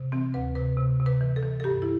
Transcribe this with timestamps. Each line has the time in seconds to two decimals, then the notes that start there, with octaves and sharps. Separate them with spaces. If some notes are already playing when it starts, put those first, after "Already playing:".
Already playing: C3
0.12 E3 C4
0.34 D2 B4
0.55 C3 B4
0.77 C3
1.00 C3
1.06 B4
1.21 E3
1.36 A4
1.43 E3
1.60 A4
1.64 G2 G4
1.82 E4